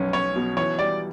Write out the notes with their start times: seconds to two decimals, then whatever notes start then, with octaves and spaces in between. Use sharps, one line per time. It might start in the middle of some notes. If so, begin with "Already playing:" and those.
Already playing: B1 C#4
0.13 C#4 C#5
0.36 B2
0.57 E3 C#5
0.79 G3 D5